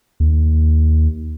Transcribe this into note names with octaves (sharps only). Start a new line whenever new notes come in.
D#2